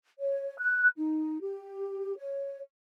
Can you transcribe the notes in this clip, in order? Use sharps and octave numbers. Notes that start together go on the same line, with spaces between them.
C#5
F#6
D#4
G4
C#5